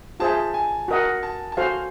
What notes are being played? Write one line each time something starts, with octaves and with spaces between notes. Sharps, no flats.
F4 G#4 C5 E5 A5
G#5
F#4 A#4 D#5 F#5
A5
A5
F#4 A4 C5 F5 G#5